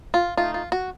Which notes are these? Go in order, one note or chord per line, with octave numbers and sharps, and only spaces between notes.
F4
A3 D#4 F4
F4
F#4